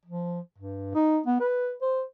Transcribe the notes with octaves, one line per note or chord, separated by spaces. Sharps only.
F3
G2
D#4
B3
B4
C5